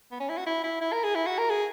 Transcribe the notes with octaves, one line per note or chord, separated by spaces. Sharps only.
B3
C#4
E4
F#4
E4
E4
E4
A#4
G#4
E4
F#4
A#4
G#4